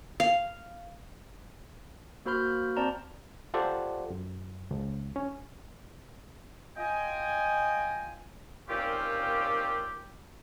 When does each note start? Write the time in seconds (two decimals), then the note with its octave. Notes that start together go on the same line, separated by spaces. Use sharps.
0.20 F5
2.26 A#3 F#4 C5 B5 F6 G6
2.76 C4 C5 D5 A5 A#5
3.54 F4 G4 A4 C5 D5 F#5
4.10 F#2
4.71 C#2
5.16 C#4
6.77 F4 D#5 G5 G#5
8.69 A#2 D#3 C4 C#4 F4 G4